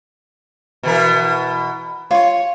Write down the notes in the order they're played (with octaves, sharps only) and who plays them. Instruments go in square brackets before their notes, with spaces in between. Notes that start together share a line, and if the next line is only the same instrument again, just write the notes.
[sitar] B2 E3 A#4
[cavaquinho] F4 C#6 [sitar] C#5